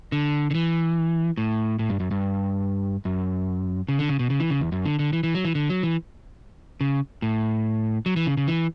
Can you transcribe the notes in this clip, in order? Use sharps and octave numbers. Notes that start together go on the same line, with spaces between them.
D3
D3
E3
A2
A2
G2
F#2
G2
F#2
C#3
D3
C#3
B2
C#3
E3
C#3
E2
F#2
D3
D3
E3
E3
F#3
E3
D3
F#3
E3
C#3
A2
F#3
E3
C#3
C#3
E3